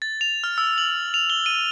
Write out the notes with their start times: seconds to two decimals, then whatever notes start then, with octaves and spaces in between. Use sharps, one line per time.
0.02 A6
0.21 F7
0.44 F6
0.58 E6
0.78 F#7
1.14 F7
1.30 G7
1.46 D#7